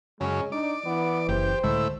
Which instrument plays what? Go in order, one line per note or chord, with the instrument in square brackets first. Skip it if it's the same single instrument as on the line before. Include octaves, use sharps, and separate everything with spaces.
[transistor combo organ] F#2 C#3 [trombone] G#3 [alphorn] C#4
[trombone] D4 [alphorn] D#4 [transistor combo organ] D5
[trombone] E3 [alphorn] B3
[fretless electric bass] F#1 [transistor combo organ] G4 [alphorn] C5
[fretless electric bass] C#2 D3 G#3 [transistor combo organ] A2 E4